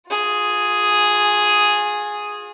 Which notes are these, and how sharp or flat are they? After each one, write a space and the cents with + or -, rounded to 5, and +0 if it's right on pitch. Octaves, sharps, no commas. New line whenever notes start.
F4 +40 G#4 +0